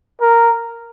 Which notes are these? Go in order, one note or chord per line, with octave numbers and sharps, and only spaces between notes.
A#4